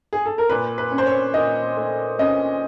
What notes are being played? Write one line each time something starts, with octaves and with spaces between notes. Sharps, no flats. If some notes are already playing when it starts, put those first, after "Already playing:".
G#4
A4
A#4
A#2 B4
B4
C#4
C5
C#5
A#2 D#5
A3
C#4 D#5